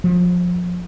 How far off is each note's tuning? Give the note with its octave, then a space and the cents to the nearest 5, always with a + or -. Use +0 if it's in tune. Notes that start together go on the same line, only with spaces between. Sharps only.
F3 +30